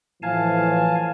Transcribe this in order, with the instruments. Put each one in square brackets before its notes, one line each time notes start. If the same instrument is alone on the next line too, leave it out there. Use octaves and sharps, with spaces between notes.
[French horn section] A2 E3 F3 [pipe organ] F5 G#5 A5